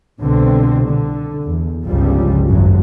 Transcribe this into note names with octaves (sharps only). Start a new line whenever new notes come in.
C2 B2 D3 C4
D3
E2
G1 C#2 F3 G3
G#1 F#2 F#3